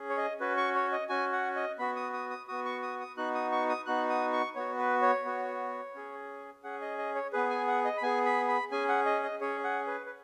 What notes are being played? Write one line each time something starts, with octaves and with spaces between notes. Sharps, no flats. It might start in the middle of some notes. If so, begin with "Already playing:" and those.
Already playing: C#4 G#4
C#5
D#5
C#4 F#4 B4
C#6
C#5
D#5
C#4 F#4 G#5
F#5
D#5
B3 F#4 B5
D#6
D#6
D#6
B3 F#4 D#6
C#6
D#6
D#6
B3 D#4 F#4 F#6
D#6
C#6
D#6
B3 D#4 F#4 F#6
D#6
C#6
B3 F#4 C#5
B4
C#5
B3 F#4
C#4 G#4
C#4 G#4 F#5
D#5
D#5
C#5
B3 G#4 B4
G#5
F#5
D#5
B5
B3 G#4 G#5
B5
B5
C#4 G#4 G#5
F#5
D#5
D#5
C#4 G#4 C#5
F#5
B4
B4